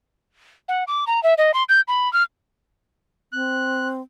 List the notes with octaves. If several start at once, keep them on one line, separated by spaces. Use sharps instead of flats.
F#5
D6
A#5
E5
D#5
C6
G6
B5
F6
C4 F#6